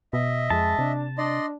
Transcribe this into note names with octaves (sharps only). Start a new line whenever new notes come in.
B2 D#5 E5
F2 G#3 A5
C3 D4
D4 D5 D#5 C6